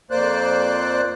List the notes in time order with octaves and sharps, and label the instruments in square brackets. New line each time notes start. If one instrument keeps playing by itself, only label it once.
[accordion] F2 A#3 C5 D5 F#6